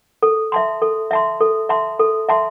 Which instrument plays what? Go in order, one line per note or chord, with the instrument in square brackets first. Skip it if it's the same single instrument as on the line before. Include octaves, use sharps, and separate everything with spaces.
[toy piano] A4
E5 A5 C6
A4
E5 A5 C6
A4
E5 A5 C6
A4
E5 A5 C6